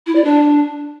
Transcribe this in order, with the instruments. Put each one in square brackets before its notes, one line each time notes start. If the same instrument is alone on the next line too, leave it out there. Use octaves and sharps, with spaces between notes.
[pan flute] E4
D5
D4